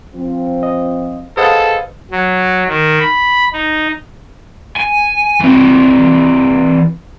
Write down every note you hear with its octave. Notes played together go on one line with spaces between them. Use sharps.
F3 C4
D#5
G#4 A4 B4 C5 D#5 F5 F#5
F#3
D#3
B5
D#4
G#5
E3 C4